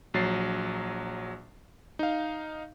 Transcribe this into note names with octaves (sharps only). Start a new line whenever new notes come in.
A#1 F#3 A6 C7
D#4 F5